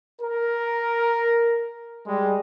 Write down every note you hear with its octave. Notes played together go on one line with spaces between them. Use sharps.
A#4
G3 G#3